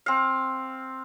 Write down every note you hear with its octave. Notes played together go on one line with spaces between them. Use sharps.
C4 F5